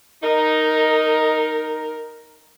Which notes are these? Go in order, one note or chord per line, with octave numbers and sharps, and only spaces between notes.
D#4 A#4